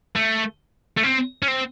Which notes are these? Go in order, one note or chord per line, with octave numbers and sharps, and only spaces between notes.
A3
A3
C4
C#4
C4